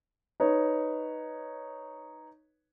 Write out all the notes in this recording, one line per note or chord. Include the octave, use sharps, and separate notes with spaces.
D#4 B4 C#5